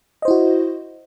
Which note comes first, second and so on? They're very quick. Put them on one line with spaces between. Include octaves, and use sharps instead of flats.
D#5 C5 E4 F#4